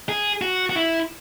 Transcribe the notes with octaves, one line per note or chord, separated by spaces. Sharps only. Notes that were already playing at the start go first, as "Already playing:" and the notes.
G#4
F#4
F#4
E4